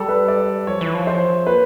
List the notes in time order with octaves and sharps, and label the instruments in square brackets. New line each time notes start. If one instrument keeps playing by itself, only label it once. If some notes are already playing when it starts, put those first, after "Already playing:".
Already playing: [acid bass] G3 [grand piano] A4
[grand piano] B4
D5
[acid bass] F3 [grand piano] C#5
[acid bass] E3
F3
[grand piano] C5
[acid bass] A#3 [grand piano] B4